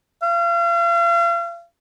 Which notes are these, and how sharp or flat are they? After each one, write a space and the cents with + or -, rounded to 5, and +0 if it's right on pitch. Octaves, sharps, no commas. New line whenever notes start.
F5 -40